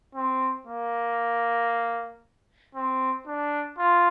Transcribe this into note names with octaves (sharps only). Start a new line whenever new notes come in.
C4
A#3
C4
D4
F4